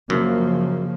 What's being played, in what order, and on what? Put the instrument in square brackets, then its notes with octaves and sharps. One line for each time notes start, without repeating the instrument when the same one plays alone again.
[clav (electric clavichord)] F#2 [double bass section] C#3 F3 A#3